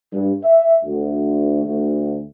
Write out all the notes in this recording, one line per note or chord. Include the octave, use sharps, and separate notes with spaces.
G2
E5
D2
D2